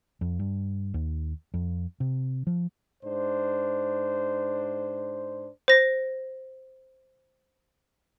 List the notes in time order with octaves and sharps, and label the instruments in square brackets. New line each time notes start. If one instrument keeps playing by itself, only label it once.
[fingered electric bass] F2
G2
D#2
F2
C3
F3
[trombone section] G#2 D4 C5
[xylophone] C5 A#6